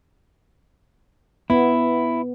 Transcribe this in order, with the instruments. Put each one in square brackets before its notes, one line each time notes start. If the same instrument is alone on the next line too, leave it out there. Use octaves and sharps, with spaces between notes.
[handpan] B3 [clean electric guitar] E4